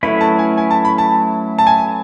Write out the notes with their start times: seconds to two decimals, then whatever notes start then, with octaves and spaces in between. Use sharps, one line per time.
0.03 F#3 A3 C#4 E4 B4 B5
0.21 A5
0.39 G#5
0.57 G#5
0.71 A5
0.85 B5
0.98 A5
1.59 A5
1.67 G#5